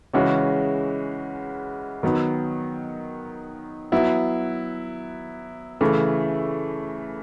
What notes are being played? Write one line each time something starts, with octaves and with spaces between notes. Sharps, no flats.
C#3 E3 G#3 C#4 F#4
D#3 F#3 B3
F#3 B3 E4
C#3 E3 A3